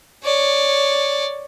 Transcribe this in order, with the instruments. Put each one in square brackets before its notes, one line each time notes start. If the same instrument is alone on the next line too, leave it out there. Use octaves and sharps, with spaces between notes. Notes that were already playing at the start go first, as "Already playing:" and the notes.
[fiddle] C#5 D5